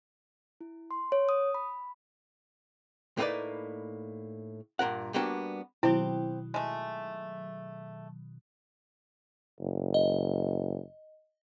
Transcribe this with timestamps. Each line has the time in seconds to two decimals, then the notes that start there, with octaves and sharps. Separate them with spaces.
0.61 E4
0.91 C6
1.12 C#5
1.29 D#6
1.54 B5
3.17 A2 A#3 B3 D#4 B4 D5
4.79 G2 A#2 A#4 F#5
5.14 G3 A#3 B3 D4 F#4
5.83 B2 D#3 F#3 C4 E4 G4
6.54 G#3 A3
9.60 F#1
9.94 D#5